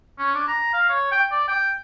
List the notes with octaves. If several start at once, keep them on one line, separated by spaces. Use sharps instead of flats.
C#4
D4
A#5
F5
C#5
G5
D5
G5